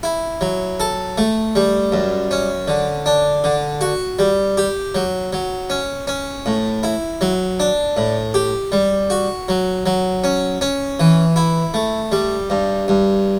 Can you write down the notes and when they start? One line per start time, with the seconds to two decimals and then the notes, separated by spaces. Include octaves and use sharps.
0.03 E4
0.41 F#3
0.80 A4
1.18 A3
1.55 G3
1.92 F#2
2.31 C#4
2.68 D3
3.06 D4
3.44 D3
3.81 F#4
4.19 G3
4.58 G4
4.95 F#3
5.33 F#3
5.70 C#4
6.07 C#4
6.46 A2
6.83 E4
7.21 F#3
7.60 D4
7.97 A2
8.34 G4
8.72 G3
9.10 F#4
9.49 F#3
9.86 F#3
10.24 C#4
10.61 C#4
11.00 E3
11.36 E4
11.74 A3
12.12 G3
12.50 G2
12.88 G2